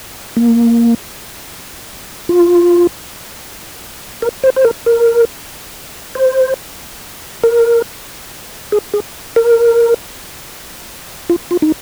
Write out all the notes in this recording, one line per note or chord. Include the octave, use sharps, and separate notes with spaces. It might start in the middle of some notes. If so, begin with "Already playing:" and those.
A#3
F4
A#4
C5
C5
A#4
A#4
C5
A#4
G#4
G#4
A#4
F4
F4
D#4